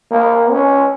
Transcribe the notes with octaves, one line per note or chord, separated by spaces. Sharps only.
A#3
C#4